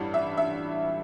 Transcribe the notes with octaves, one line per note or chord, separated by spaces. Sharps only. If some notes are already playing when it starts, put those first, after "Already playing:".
Already playing: A1 G2 E3 G3
E5
E5